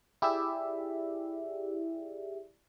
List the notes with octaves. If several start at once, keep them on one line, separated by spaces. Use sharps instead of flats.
E4 G4 G#4 D5 E5